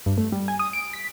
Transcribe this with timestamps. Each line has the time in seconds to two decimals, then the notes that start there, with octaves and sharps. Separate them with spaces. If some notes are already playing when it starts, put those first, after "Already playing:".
0.06 G2
0.18 A3
0.32 G3
0.48 G#5
0.59 D#6
0.73 D7
0.93 B6